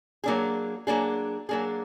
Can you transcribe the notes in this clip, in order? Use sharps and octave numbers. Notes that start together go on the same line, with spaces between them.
F#3 A#3 D4 G#4
F#3 A#3 D4 G#4
F#3 A#3 D4 G#4